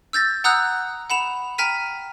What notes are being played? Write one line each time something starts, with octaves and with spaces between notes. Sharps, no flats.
E6 G6 A6 A#6
F#5 A#5 D#6 E6 F#6 G6
F#5 B5 E7 F7
G5 A#5 F6 B6 D#7